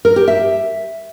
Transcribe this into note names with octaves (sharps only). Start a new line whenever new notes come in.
A#4
G4
E5